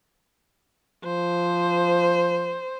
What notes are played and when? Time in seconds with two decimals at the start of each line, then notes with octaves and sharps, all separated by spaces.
1.05 F3 C5